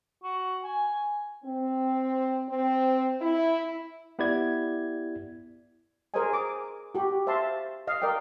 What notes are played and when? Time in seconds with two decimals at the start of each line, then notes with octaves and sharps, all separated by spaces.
0.24 F#4
0.64 G#5
1.44 C4
2.49 C4
3.21 E4
4.19 B3 E4 G4 D5 G#6
6.14 G#4 A#4 C5 C#5 D#5 G#5
6.33 D6
6.95 F#4 G4
7.27 C5 E5 F5 A5 C6
7.87 D#5 F5
8.02 A#4 D5 D#5 G5